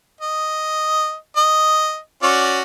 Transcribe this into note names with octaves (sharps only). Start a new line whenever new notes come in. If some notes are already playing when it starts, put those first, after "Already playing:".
D#5
D#5
C#4 F#4 D5